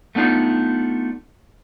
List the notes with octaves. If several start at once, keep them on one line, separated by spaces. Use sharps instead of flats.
A3 B3 D4 D#4 F4